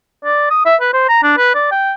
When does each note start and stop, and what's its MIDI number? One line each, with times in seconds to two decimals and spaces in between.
0.24 0.46 74
0.50 0.61 87
0.65 0.76 76
0.81 0.92 71
0.93 1.04 72
1.08 1.23 82
1.23 1.32 62
1.37 1.53 71
1.55 1.67 74
1.71 1.93 79